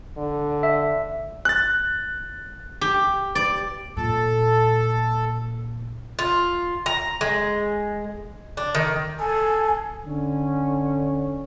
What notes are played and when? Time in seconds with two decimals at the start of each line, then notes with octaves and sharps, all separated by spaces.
0.17 D3
0.63 E5
1.45 F#6 A6
2.81 G4
3.35 D5
3.97 A#2 A4
6.19 F4
6.86 A#5
7.21 G#3
8.57 D4
8.75 D#3
9.20 A4 G#5
10.06 D3 C#4